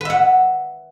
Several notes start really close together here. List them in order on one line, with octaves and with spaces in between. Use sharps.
B4 E5 F#5